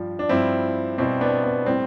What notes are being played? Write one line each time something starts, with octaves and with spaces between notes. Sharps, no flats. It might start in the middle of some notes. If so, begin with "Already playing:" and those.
Already playing: G2 F3
D4
G2 F3 C4 E4
B2 G3 C4 E4
B3 D4
B3
A2 G3 C4